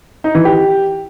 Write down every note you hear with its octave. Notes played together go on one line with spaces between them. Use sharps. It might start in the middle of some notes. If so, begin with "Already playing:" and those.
D#4
E3
G4